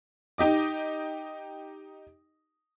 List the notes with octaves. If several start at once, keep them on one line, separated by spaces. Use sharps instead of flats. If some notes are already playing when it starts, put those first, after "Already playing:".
D#4 G4 D#5 D6